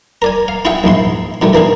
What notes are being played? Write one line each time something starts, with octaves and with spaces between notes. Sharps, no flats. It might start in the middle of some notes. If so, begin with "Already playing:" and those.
A#4 D5 G#5
F5
E4 F4 G#4 E5 F#5 G5
A#1 G#2 E4 C6
B2 D#3 G3 A3
E3 A#3 D4 G#4